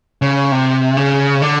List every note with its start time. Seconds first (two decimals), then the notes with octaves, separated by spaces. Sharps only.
0.22 C#3
0.52 C3
0.97 C#3
1.42 D3